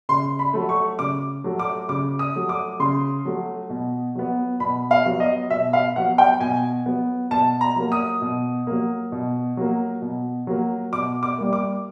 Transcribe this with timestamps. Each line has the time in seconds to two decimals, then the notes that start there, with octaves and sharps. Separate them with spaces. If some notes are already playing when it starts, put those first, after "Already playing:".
0.09 C#3 C6
0.39 B5
0.53 F#3 A3
0.69 C#6
0.99 C#3 D6
1.44 F#3 A3
1.59 D6
1.89 C#3 D6
2.19 D#6
2.35 F#3 A3
2.49 D6
2.80 C#3 C6
3.25 F#3 A3
3.70 B2
4.15 F#3 B3
4.60 B2 B5
4.91 F5
5.06 F#3 B3
5.20 D#5
5.50 B2 E5
5.73 F5
5.96 F#3 B3 F#5
6.18 G5
6.41 B2 G#5
6.86 F#3 B3
7.31 B2 A5
7.61 A#5
7.76 F#3 A#3
7.92 D#6
8.22 B2
8.67 F#3 A#3
9.12 B2
9.57 F#3 A#3
10.02 B2
10.47 F#3 A#3
10.93 B2 D6
11.23 D6
11.38 G3 A#3
11.53 D6